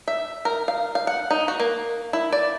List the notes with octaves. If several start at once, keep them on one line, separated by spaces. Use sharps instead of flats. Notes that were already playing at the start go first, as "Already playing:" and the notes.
E5
A#4
F5
F5
F#5
D#4
F#4
A#3
E4
D5